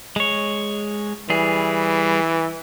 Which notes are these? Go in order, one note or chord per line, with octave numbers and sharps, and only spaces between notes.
G#3 C#5
E3 G3 G#4